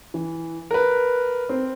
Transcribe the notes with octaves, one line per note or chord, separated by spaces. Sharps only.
E3
A#4 B4
C4